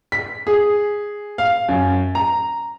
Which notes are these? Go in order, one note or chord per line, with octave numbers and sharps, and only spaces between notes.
B6
G#4
F5
F#2
A#5